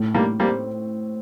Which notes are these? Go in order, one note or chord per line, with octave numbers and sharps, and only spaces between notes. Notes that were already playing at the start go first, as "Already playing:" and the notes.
Already playing: A2
A2 G3 A#3
G3 A#3 C4